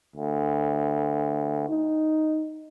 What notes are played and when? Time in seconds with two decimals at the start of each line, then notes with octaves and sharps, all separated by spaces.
0.16 D2
1.69 D#4